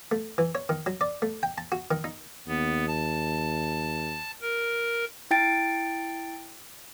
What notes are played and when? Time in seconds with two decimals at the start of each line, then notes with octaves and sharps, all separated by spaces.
0.11 A3
0.38 E3
0.55 C#5
0.69 D#3
0.86 F#3
1.01 D5
1.22 A3
1.43 G5
1.58 A5
1.72 F#4
1.91 D#3
2.04 D#4
2.47 D#2 B3
2.88 A5
4.41 A#4
5.31 E4 G5 A6 D7